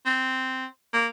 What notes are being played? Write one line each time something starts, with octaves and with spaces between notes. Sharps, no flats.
C4
A#3